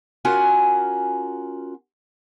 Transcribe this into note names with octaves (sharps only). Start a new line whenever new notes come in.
C#4 F4 F#4 A#4 F#5 G#5